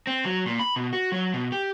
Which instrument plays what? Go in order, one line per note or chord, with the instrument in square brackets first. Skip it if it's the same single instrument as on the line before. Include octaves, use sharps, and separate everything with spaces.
[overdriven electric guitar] C4
F#3
A#2
B5
B2
F#4
F#3
B2
G4